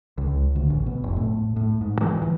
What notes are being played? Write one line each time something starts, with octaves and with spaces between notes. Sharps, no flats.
C#2
D2
A1
B2
F1
A2
A2
G#2
E3
E3